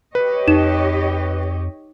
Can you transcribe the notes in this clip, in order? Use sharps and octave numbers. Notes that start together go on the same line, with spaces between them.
G4 B4 C#5 D#5
F2 D#4 E7